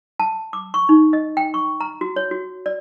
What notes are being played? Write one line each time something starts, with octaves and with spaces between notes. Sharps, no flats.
A5
D6
C#6
D#4
D#5
G5
C#6
A#5
F#4
C#5
F#4
D5